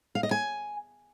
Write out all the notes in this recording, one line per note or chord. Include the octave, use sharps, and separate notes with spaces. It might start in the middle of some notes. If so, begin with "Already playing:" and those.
F5
D#5
G#5